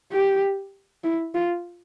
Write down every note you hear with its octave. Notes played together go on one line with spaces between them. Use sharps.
G4
E4
F4